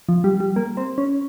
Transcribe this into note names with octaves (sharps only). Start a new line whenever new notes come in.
F3
G3
G3
A#3
C4
C#4